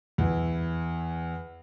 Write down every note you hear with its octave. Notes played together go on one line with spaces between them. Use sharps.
E2 E4